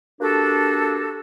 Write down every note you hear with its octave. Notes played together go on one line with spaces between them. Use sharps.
A#3 D4 F#4 G4 A4